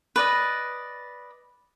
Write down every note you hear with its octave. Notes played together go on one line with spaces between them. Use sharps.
B4 D5 D#5